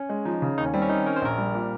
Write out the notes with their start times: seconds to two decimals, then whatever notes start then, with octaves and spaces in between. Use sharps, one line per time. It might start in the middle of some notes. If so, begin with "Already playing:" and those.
Already playing: C#4
0.09 G#3
0.25 F3 D#4
0.42 C#3
0.58 D#2 D#4
0.66 C#4
0.74 G3 C4
0.82 C#4
0.89 D#3 D#4
1.06 C#4 A#4
1.16 C5
1.22 A#1 A#4
1.38 G3
1.54 A#2